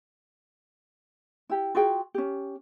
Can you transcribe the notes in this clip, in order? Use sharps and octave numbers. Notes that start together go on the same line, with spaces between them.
E4 G4
F4 F#4 G#4 G5
C#4 G4